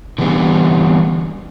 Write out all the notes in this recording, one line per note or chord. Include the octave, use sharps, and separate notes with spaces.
D3 E3 G3 B3